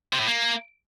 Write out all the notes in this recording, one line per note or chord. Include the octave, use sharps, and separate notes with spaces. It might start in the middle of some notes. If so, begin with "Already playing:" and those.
C3
A2
A#3